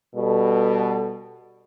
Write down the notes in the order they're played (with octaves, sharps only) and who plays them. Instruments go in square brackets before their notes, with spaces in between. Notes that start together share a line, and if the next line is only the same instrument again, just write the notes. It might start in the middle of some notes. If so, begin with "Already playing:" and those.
[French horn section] B2 G3 A4